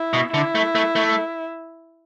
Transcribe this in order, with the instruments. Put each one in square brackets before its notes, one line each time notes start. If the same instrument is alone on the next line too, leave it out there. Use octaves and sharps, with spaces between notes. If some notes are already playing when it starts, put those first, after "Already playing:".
Already playing: [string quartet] E4
[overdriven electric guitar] B2
[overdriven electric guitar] D3 [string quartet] E4
[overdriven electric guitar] A3
A3
A3